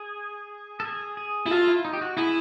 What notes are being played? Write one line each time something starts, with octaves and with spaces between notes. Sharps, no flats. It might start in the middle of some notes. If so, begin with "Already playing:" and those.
Already playing: G#4
A4
G#4
G#4
E4
F4 A4
E4
D#4
G4
F#4
E4 G#4